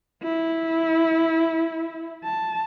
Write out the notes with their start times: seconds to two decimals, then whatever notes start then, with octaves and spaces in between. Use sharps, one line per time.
0.23 E4
2.25 A5